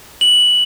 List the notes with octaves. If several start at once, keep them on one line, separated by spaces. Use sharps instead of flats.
F#7